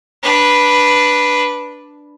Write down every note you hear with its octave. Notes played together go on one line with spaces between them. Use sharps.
D4 B4